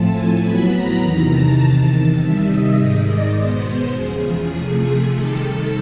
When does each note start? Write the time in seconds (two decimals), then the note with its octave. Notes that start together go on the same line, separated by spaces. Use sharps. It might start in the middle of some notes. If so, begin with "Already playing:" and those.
Already playing: A2 F3 A3 C4 A5
0.11 G#5
0.40 A2 F#3 B3 B5
0.69 A#5
0.99 E2 C3 D#3 A#5
1.29 A5
1.58 E2 C3 D#3
1.87 A5
2.17 C3 D#3 G3 E5
2.47 D#5
2.77 G#2 D#3 G#3
3.06 D5
3.36 B2 G#3 B3 C5
3.94 E2 C#3 F3 G#4
4.54 C3 F3 A3 G#4
5.13 C3 D#3 G3 A4